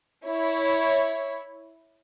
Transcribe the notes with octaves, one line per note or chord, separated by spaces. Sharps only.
E4 C#5